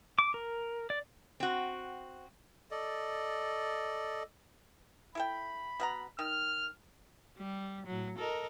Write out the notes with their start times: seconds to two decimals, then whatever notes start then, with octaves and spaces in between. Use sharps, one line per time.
0.19 D6
0.34 A#4
0.90 D5
1.40 C4 F#4
2.71 A4 D5 D#5
5.15 E4 A4 G5 B5
5.80 B2 F#5 A#5
6.19 D#3 F6
7.38 G3
7.87 A2 F#3
8.18 A4 A#4 D#5